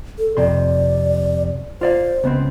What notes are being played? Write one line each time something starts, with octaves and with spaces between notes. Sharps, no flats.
A4
F2 C3 D5 C6
F4 C5 D5 F5
C#2 B3 C4